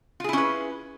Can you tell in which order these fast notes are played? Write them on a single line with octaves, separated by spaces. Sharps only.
F4 G#4 E4 C#4 B4